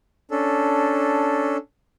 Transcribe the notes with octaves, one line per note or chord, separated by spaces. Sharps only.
C#4 D4 A4